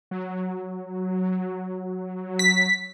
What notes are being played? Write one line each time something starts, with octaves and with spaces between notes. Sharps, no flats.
F#3
B6